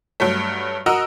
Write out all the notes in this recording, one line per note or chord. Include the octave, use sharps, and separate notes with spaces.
G2 F#3 A3
F#4 A#4 D#5 A#5 E6